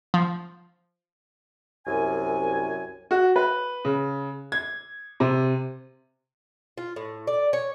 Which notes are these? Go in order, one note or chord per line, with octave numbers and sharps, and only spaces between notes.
F3
C2 F#2 G#5
F#4
B4
C#3
G#6
C3
F4
A2
D5
C#5